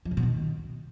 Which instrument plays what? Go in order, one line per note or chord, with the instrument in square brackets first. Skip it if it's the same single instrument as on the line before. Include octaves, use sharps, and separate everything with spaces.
[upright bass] F3
C3
B2
D#3